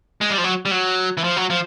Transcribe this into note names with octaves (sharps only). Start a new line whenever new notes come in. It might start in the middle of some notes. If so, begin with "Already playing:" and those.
G#3
G3
F3
F#3
G3
F#3
E3
F3
F#3
F3